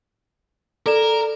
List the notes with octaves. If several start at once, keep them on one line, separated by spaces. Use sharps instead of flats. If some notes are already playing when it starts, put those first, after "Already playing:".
A4 A#4 D5 E7